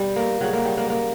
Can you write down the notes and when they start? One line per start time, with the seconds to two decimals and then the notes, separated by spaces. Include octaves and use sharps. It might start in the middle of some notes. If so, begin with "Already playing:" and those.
Already playing: B2 G3
0.16 A#3
0.41 C#3 F#3 G3
0.53 A#3
0.65 G3
0.77 A#3
0.90 A#3